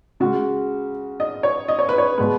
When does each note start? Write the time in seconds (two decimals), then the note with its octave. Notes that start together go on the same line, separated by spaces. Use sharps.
0.20 C#3 G#3 F#4
1.20 D#5
1.43 C#5
1.68 D#5
1.79 C#5
1.89 B4
1.98 C#5
2.18 B2 G#3 B4